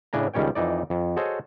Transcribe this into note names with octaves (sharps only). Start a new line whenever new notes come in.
A2 C#3 D4 G#5 A#5
C#2 D#3 G3 C#4 C#5 G5
F2 E3 D#4 D5
F2
F#4 G#4 A4 C5 C#5 D#5